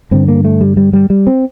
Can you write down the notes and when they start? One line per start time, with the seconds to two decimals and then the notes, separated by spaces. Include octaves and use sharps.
0.11 G2 D3 C4
0.28 A#3
0.45 A3
0.61 G3
0.77 G3
0.93 G3
1.10 G3
1.27 C4